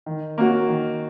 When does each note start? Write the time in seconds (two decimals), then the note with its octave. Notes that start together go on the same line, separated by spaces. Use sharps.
0.06 D#3
0.38 A#3 C#4 F#4
0.68 D#3